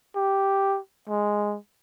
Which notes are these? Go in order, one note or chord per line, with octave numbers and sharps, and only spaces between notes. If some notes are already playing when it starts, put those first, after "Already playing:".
G4
G#3